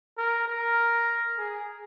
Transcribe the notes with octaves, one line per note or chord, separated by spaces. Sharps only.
A#4
A#4
G#4